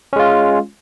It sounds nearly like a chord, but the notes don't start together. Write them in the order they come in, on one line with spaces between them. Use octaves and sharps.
C#4 G#3 F4